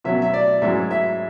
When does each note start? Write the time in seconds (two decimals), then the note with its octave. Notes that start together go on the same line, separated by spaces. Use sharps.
0.04 B2 F#3 C#4 E5
0.22 E5
0.33 D5
0.62 G#2 F#3 C#4 E4 E5
0.91 E5